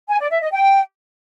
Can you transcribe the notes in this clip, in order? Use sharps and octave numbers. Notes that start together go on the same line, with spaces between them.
G#5
D5
E5
D#5
G5